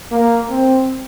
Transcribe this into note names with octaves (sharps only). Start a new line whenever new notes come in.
A#3
C4